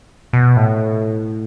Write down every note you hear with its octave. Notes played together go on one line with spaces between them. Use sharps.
B2
A2